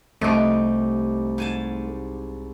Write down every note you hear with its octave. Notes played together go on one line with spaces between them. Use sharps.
C2 A3 D#4 G4 D#5 D7
G#2 G#5 A5